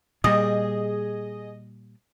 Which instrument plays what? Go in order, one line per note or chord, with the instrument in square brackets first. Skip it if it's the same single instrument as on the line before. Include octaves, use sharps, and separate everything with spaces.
[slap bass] A#2 G3 [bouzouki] G#4 [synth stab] D#5